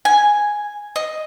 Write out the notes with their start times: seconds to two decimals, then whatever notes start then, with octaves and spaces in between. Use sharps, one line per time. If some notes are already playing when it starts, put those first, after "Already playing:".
0.05 G#5
0.96 D#5